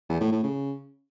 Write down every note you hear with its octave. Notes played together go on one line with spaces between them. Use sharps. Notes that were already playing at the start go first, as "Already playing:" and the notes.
E2
A2
A2
C#3